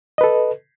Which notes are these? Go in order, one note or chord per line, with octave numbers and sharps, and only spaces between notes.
A4 B4 D#5